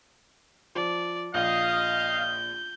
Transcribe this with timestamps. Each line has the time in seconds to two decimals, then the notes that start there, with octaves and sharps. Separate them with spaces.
0.75 F3 D5
1.34 A#1 D#5 F5 G6